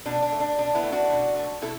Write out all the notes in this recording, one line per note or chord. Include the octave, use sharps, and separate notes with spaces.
B2 D4
D4
A3
D4
B2 D4
B3 E4
A3
D4 F#4
B2
A3
B2 E4 A4